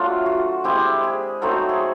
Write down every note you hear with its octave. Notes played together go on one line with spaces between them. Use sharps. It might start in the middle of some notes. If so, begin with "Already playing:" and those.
Already playing: F#3 A3 D4 F4
F#4
G#3 C4 E4 G4
G#4
F#3 A3 C4 D#4 A4
G#4